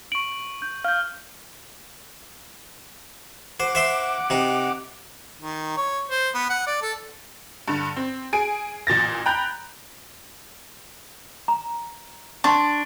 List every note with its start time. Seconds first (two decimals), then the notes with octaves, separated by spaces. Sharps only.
0.12 C#6 D7 F#7
0.62 G6
0.85 F5 F6 G6
3.60 C5 F#5 D6
3.75 C5 E5 C6
4.30 C3 D#4
5.41 D#3
5.77 C#5
6.10 C5
6.35 B3
6.50 F#5
6.67 D5
6.82 A4
7.68 G2 D3
7.96 C4
8.33 G#4 G#5 D7
8.87 A1 A#2 A6 A#6
9.26 G5 A#5 B5 F#6 G6
11.48 A#5
12.44 D4 C6 C#6